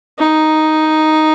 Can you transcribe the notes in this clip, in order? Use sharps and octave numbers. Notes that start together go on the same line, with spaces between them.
D#4